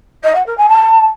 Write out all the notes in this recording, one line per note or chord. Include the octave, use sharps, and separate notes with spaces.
D#5
F#5
A#4
G#5
A5